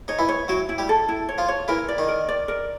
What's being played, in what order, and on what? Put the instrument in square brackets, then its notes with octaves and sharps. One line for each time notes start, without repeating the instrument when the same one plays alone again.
[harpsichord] D#4 [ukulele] C#5
[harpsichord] E3 E4
[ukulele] C#5
[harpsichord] F#3 F#4 [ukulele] E4
[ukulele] E4
[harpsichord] G3 G4
[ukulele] A4
E4
C#5
[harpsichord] F3 F4
[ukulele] C#5
[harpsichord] E3 E4 [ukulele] A#4
[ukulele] D5
[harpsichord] D#3 D#4
[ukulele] A#4
D5
A#4